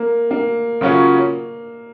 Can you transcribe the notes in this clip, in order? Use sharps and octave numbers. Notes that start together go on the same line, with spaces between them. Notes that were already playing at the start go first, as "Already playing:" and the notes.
Already playing: A#3
A#3
C#3 F#3 C#4 F4